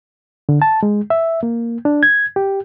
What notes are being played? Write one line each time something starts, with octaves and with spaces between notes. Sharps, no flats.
D3
A5
G#3
E5
A#3
D4
G#6
G4